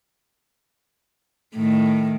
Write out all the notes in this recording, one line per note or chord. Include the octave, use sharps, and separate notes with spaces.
A2 D#3